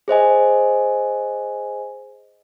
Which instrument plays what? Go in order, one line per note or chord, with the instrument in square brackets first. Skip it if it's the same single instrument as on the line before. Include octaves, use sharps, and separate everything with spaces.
[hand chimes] G#4 C5 D#5 G#5